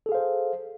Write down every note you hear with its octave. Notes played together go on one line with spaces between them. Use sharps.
G#4 A4 C5 F5